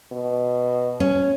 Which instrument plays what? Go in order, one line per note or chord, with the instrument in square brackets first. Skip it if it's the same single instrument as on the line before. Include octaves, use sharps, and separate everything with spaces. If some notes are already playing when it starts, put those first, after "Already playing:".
[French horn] B2
[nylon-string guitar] C#4